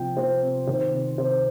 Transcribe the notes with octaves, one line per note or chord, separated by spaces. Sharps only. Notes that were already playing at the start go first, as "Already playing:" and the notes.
Already playing: C3 F3 G5
F3 C5
C3
D#3 C5
C3
C3 C5